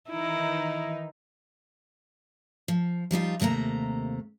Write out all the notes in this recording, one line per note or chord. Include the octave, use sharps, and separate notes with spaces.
D#3 E3 D#4 E4
F3
F3 G3 D#4 F4
D#2 C3 A3 A#3 A#5